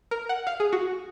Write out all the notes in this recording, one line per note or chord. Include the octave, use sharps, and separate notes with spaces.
A#4
F#5
F5
G#4
F#4